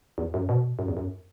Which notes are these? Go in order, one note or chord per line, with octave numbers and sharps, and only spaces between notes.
E2
F#2
B2
F#2
E2
F#2